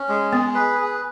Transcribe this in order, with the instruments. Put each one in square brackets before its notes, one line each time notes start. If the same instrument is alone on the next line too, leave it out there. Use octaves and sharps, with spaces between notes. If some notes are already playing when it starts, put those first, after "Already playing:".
Already playing: [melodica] C#4
G#3
[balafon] B3 [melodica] G#4
[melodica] B4
G#4